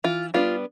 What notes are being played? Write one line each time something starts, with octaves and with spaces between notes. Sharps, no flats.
E3 F4
G3 B3 D4 F4